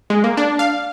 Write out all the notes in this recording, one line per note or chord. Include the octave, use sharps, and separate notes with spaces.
G#3
A#3
D4
F5